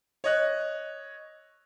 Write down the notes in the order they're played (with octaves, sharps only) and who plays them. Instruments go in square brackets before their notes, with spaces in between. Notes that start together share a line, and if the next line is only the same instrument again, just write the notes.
[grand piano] C#5 D#5 F#6